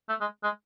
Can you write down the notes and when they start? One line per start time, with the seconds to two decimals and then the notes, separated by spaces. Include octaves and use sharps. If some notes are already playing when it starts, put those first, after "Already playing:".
0.09 A3
0.21 G#3
0.44 G#3